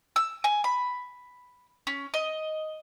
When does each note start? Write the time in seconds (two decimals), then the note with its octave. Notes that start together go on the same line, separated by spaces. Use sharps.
0.16 E6
0.44 G#5
0.64 B5
1.87 C#4
2.14 D#5